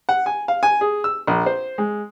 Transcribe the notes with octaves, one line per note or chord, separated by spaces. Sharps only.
F#5
G#5
F5
G#5
G#4
E6
A#1
C5
G#3